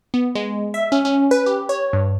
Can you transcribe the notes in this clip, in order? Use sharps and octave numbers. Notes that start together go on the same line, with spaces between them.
B3
G#3
E5
C#4
C#4
B4
G4
C#5
G2